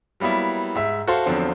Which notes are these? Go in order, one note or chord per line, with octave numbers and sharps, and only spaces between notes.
F#3 G3 A#3 B3 E4
G#2 E5
F#4 A4 C5 F5 C6
E2 D3 F3 F#3 C4